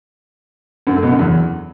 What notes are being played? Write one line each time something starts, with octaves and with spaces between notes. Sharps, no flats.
F#2
A3
B2
F#2
E2